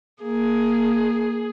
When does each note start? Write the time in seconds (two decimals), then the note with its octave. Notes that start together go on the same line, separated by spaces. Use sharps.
0.23 A#3 G#4